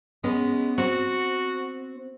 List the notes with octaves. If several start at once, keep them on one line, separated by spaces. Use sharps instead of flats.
G#3 B3 C#4 B4
C4 F#4